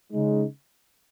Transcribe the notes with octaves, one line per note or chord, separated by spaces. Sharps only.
C#3 G#3 D#4